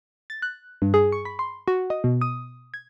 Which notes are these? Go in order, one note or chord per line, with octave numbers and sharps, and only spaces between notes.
A6
F#6
G2
G#4
C#6
B5
C6
F#4
D#5
B2
D#6
G#6